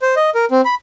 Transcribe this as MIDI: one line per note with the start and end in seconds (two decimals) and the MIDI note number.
0.02 0.15 72
0.16 0.30 75
0.35 0.45 70
0.51 0.61 60
0.65 0.75 83